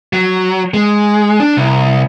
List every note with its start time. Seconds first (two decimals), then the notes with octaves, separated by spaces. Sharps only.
0.13 F#3
0.74 G#3
1.40 D4
1.57 C2